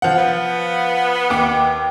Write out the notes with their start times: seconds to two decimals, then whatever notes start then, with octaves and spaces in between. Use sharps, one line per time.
0.02 F3 F#5
0.18 B3
1.30 D#2 D6